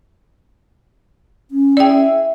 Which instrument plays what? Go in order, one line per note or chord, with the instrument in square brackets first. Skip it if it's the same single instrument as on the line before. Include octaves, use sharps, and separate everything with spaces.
[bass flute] C#4
[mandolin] E4 G#4 [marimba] D5 G5